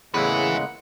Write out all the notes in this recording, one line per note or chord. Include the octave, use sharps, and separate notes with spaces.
E2 A2 C#3 G#3 A#3 B4 E5 F#5